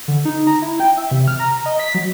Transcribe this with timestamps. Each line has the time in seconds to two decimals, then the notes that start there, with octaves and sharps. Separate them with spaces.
0.08 D3
0.25 D#4
0.47 A#5
0.62 E4
0.80 G5
0.97 E5
1.11 C3
1.28 F6
1.39 A#5
1.66 D#5
1.79 B6
1.95 F#3